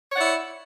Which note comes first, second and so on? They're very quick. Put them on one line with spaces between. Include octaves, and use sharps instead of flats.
C#5 F#5 D5 E4